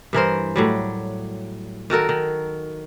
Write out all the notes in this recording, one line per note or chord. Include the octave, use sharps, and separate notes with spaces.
G2 E3 A#4 C5
A2 F#3 G3
D#3 F#4 A4 A#4
D#3